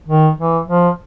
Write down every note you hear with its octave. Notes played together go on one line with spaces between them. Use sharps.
D#3
E3
F3